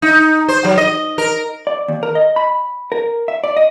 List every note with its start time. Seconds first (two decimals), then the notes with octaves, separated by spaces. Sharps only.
0.02 D#4
0.48 C5
0.64 F#3
0.78 D#5
1.18 A#4
1.67 D5
1.88 D#2
2.03 A#4
2.15 D#5
2.36 B5
2.92 A#4
3.28 E5
3.44 D5
3.57 D#5